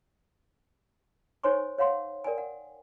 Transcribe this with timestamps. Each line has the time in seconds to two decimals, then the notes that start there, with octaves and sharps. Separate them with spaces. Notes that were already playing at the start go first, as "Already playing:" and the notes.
1.44 D#4 C5 C#5 G#5 C6 C#6
1.79 C#5 F5 F#5 C6
2.24 A#4 D5 G5 G#5
2.38 F#5